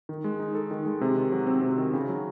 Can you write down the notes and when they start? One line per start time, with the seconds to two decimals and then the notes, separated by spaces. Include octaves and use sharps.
0.09 D#3
0.24 G#3
0.39 D#4
0.54 A4
0.71 D#3
0.86 G#3
1.01 C3
1.16 D#3
1.32 F#3
1.47 C4
1.62 C3
1.78 D#3
1.93 C#3
2.09 F#3